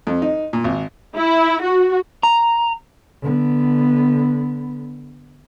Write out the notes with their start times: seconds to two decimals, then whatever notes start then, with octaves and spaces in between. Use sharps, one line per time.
0.07 F2
0.22 D#4
0.53 A#2
0.64 G#1
1.15 E4
1.62 F#4
2.23 A#5
3.22 D3 B3